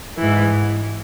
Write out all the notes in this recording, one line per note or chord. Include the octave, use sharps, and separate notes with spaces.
G#2 E3